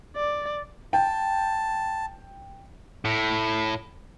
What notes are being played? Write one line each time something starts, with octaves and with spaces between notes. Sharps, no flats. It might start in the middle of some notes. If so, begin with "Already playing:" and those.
D5
G5 A5
A2